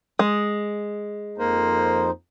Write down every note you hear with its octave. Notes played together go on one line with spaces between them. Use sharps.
G#3
F2 A#3 D#4 C5